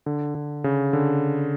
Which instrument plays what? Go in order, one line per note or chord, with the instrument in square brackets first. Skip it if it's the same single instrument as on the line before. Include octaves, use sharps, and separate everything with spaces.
[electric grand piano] D3
D3
C#3
D3